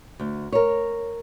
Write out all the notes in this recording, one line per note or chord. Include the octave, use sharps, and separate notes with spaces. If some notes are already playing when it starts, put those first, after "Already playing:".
D2
A#4 C#5